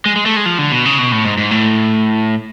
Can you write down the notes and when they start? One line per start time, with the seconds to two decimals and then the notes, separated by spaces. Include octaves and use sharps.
0.06 G#3
0.16 G#3
0.26 A3
0.36 G#3
0.46 F3
0.58 D3
0.72 B2
0.85 C#3
0.98 B2
1.12 A2
1.25 G#2
1.38 G#2
1.51 A2